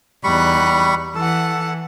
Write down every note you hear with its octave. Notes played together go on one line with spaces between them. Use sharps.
E2 G3 D#4 B5 C#6 F#6
E3 A4 F#5